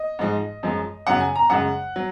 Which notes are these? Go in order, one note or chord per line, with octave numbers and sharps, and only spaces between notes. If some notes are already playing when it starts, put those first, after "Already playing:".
Already playing: D#5
G#2 F3 G#3
F#2 F3 G#3
F#2 C#3 F#3 F#5
G#5
A#5
F#2 C#3 G#3 F#5
F#3